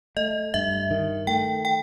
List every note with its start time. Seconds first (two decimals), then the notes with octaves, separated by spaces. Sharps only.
0.17 A3 D#5
0.54 G2 E5
0.91 D#3
1.27 A3 G5
1.65 G5